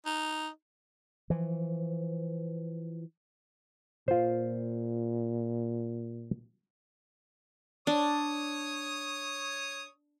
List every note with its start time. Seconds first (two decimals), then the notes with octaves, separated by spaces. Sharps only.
0.06 D#4
1.30 E3 F3
4.08 A#2 F4 C5
7.87 D4 C#5 D#6